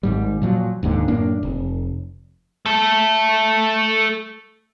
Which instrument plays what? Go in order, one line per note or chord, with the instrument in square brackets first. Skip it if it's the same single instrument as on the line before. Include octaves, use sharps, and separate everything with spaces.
[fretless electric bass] G#1 G#2 G3
A#2 F3 F#3
D#1 D#2 G#2 D3
F#2 A2 A#3 D4
F1
[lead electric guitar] A3 A4